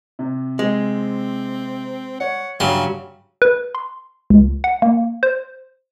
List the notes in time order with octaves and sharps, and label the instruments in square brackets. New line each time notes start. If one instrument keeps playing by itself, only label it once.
[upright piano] C3
[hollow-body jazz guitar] G#3 [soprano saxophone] C4
[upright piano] C#5 [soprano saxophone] F#5
[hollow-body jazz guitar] G2 [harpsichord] C#3 F#3 C6 [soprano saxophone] E5
[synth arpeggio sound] B4
C6
C#2
F#5
A#3
C5